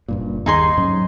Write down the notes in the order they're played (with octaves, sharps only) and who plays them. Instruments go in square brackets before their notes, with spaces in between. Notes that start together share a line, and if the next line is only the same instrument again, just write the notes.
[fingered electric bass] F#1 G2 A#2
[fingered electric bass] D#2 [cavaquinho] D#4 G#4 C6
[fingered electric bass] G#2 F#3 C#4